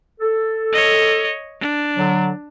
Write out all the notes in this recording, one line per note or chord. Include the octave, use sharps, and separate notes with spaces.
A4
C#5 D#5
D4
D3 F#3